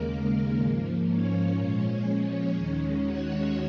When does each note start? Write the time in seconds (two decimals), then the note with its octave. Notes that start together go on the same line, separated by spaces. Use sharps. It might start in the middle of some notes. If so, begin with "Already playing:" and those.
Already playing: D#2 C#3 G#3 A#3 A#4
0.61 G#2 F3 A#3
1.09 C#4 C#5
1.57 A#2 F3 G#3
2.06 C#4 C#5
2.55 D#2 D#3 G#3
3.03 F#4 F#5